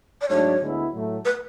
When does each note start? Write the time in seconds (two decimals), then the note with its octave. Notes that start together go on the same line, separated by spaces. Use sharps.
0.22 D5
0.29 G#2 F#3 A3 D4 C#5
0.61 D2 D3 G#3 B3 E4
0.93 A2 F#3 A3
1.25 B4